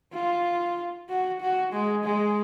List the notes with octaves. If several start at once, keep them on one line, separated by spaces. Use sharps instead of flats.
F4
F#4
F#4
G#3
G#3